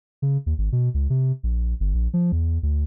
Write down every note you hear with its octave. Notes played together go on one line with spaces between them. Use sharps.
C#3
D#2
G#1
B2
C#2
C3
A#1
G1
A#1
F3
E2
D2